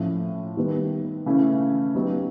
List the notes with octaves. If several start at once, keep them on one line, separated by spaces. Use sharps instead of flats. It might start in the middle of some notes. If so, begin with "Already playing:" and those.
Already playing: A2 F3 A3 C#4 F4
D#3 G3 B3
C#3 E3 A3 C#4 E4
F#3 B3 D#4 G4